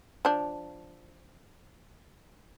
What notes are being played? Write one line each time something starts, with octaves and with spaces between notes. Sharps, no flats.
F3 D4